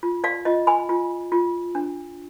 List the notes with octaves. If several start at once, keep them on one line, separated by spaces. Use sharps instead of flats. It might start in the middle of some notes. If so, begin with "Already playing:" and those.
F4
D5 F5
F4 D#5
G#5 B5
F4
F4
D4